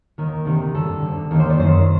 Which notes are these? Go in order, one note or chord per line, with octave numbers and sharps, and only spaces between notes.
D#2 D#3 A#4
D2 C3 D#3
G2 D3 A4
D2 D3
D#2 D#3 A#4
C5
D5
F#2 D#3 C5